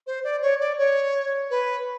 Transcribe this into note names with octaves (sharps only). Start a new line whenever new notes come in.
C5
D5
C#5
D5
C#5
B4